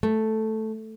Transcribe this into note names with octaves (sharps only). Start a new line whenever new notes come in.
A3